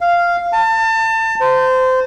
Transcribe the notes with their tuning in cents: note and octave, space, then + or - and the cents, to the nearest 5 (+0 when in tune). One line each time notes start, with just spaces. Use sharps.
F5 -5
A5 +30
C5 -20